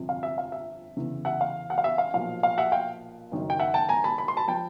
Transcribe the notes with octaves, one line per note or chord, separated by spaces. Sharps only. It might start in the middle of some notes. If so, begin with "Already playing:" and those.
Already playing: G1 F2 C3 F3
F5
E5
F5
E5
F1 E2 C#3 E3
E5 F#5
F5
F#5
F5
E5
F5
B1 A#2 F3 F5
F5
E5 F#5
F5 G5
F#1 F#2 D#3
G5
E5 F#5
G5 A5
G#5 A#5
A5 B5
B5
C6
A5 B5
F3 G5 A5